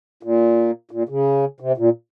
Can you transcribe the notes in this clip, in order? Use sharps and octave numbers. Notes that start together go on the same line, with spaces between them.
A#2
A#2
C#3
C3
A#2